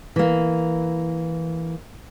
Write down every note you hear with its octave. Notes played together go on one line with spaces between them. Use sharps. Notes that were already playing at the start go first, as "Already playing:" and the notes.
E3 A#3